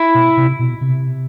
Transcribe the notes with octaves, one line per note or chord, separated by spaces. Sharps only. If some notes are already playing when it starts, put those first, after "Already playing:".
Already playing: E4
B2
C3
B2
C3